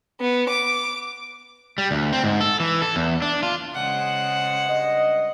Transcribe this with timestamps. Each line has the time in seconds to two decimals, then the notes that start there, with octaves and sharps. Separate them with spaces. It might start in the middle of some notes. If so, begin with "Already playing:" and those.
0.21 B3
0.50 D6
1.78 G3
1.91 D2
2.13 C4
2.24 G#2
2.41 A4
2.60 E3
2.82 A4
2.96 E2
3.22 D4
3.43 F4
3.75 C#3 G#3 C5 F#5
4.66 G2 D#5